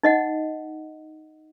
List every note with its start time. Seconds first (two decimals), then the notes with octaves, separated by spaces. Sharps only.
0.03 D#4 D#5 F#5